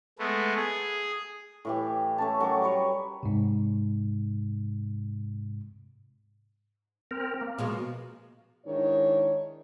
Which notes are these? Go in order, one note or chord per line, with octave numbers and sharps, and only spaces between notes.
G#3 A3 B3
G#4
A2 E3 G4
A3 C#4 A5
F#3 A#4 C#6 D6
G3 B4 C#5
G#2 C3
C4 A#4
A#3
B2 F3 G#3
G#2 D#3 D4 E4 C#5